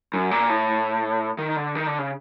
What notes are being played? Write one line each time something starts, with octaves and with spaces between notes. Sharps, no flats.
F#2
A#2
A2
D#3
D3
D#3
D3
C#3